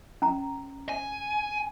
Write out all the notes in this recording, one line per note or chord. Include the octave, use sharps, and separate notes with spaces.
C#4 A#5
G#5